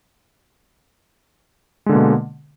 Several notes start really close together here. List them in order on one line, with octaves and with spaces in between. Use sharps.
G#3 D3 A#3 B2